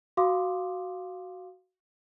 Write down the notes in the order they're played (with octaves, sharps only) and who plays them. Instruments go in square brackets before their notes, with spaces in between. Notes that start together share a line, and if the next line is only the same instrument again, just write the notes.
[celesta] F#4 F5 C6 D6 D#6